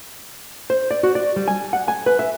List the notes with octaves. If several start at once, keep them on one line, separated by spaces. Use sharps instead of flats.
C5
D5
F#4
D5
G3
G#5
F#5
G#5
B4
E5